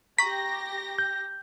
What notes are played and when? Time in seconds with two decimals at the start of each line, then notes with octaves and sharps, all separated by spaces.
0.18 G4 A#5 C#6 A#6 B6
0.99 G6